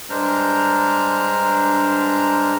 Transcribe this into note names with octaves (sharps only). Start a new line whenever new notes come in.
G2 G#3 D4 C5 A#5 F6